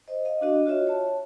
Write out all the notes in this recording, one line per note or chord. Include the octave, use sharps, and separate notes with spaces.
C5 D#5
D#5 F5
D4 F#4 D#5
F4 F#4 C#5 D#5 E5
C#5 A5